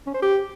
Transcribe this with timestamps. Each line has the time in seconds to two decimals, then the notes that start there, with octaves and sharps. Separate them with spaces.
0.07 C#4
0.14 C5
0.22 G4